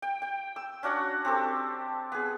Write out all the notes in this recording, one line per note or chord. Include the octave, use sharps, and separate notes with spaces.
G5
G5
E6
C#4 D4 F#4 F#5
C4 G4 A4
B3 G#4